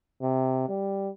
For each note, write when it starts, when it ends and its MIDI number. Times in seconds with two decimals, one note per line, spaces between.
0.22 0.68 48
0.69 1.09 55